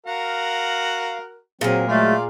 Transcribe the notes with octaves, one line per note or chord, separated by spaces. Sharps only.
F#4 A#4 F5 F#5
A#2 F#3 C4 G#4 A#4
F#3 G#3 A3 F4 D5 F5